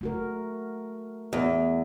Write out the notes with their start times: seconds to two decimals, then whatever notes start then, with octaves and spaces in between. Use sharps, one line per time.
0.01 A3 F#4 A#4
1.33 E2